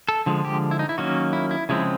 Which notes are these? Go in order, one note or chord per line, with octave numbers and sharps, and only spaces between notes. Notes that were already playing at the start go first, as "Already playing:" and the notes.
A4
D3 F3 G#3
G4
E4
D#4
E4
D#3 F#3 A#3 C#4 F#4
E4
E4
C#3 F3 G#3 C4 E4